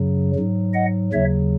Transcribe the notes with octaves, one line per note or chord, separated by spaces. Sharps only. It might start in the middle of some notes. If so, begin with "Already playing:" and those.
Already playing: F#2 C#3 F#3
G#2 F#3
D#5 F#5
D#2 C#3 F#3 C#5 E5